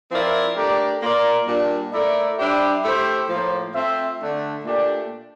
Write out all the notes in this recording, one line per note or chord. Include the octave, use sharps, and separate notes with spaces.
F3 C4 E4 A#4 D5
A3 D4 G4 A#4 D5
A#3 F4 A#4 D5
A#2 G3 D4
A3 E4 A#4 D5
G3 D4 G4 C5 E5
A3 E4 G4 C5 E5
A2 F3 A#3 F4 C5
A3 C4 F4 C5 E5
D3 A3 D4
A#2 A3 D4 G4 D5